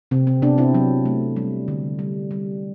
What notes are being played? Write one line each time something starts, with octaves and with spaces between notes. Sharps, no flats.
C3 C4
C4
C3 B3 D4
C4 E4
F#3
A3
G3
D3
G3
G3